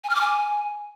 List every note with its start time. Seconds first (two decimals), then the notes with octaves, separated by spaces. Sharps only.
0.04 G#5
0.10 F6
0.15 D6
0.21 G#5